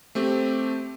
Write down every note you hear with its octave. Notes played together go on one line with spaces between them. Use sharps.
A3 C4 G4